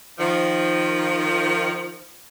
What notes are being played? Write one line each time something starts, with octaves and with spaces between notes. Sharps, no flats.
D#3 F3